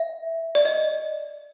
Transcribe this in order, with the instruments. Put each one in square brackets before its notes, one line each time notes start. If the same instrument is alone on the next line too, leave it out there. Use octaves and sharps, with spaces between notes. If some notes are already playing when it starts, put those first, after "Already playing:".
Already playing: [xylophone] E5
D5
D#5